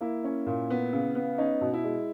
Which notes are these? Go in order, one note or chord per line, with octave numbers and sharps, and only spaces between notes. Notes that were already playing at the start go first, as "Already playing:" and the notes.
A#3 E4
C#4
A#2
B3
C#3
B3
C#4 D#4
B2
E4
G#3